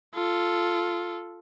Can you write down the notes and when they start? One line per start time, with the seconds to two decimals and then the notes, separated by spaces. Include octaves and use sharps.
0.14 F4 A4